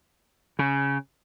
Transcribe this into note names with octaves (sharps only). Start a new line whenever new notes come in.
C#3